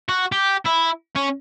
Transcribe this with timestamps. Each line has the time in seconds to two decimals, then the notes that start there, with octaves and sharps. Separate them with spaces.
0.09 F#4
0.32 G4
0.65 E4
1.16 C#4